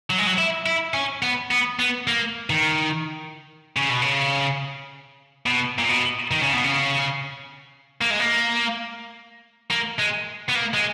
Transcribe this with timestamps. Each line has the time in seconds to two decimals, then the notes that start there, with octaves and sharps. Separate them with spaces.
0.10 F#3
0.18 G#3
0.27 F#3
0.38 E4
0.66 E4
0.94 C#4
1.23 B3
1.51 B3
1.79 B3
2.07 A#3
2.50 D#3
3.77 C#3
3.90 B2
4.02 C#3
5.46 B2
5.79 A#2
5.89 B2
6.31 D#3
6.42 C#3
6.53 B2
6.64 C#3
8.01 A#3
8.10 G#3
8.20 A#3
9.70 A#3
9.99 G#3
10.48 B3
10.55 A#3
10.73 G#3